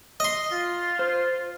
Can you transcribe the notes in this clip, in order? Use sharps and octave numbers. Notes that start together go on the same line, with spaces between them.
D#5 C6
F4
C5